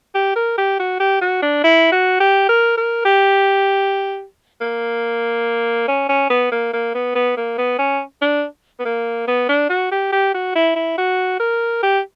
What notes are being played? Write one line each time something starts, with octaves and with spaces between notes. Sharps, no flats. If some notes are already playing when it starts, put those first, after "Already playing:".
G4
A#4
G4
F#4
G4
F#4
D4
E4
F#4
G4
A#4
A#4
G4
A#3
C#4
C#4
B3
A#3
A#3
B3
B3
A#3
B3
C#4
D4
B3
A#3
B3
D4
F#4
G4
G4
F#4
E4
E4
F#4
A#4
G4